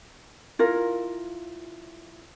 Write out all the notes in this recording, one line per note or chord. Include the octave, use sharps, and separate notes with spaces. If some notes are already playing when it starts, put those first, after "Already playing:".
E4 F4 A#4